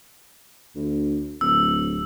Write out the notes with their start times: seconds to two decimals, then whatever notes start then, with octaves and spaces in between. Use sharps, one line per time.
0.76 D2
1.41 D1 E6